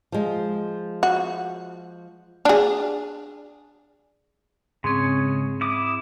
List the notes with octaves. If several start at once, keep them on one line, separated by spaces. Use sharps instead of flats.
F3 G#3
F#4
D4 G#4
G#2 C#3 G#3 C4 C#5
E4 D6 D#6